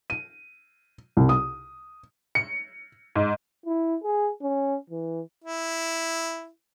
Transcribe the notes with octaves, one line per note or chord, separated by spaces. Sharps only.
D#7
C2
D#6
C#7
G#2
E4
G#4
C#4
E3
E4